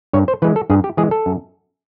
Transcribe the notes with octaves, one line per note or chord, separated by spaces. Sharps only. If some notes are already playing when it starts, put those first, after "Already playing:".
G2 C#5
C5
E3 G#3 B4
A4
G2 G#4
G4
E3 G#3 G#4
A4
F#2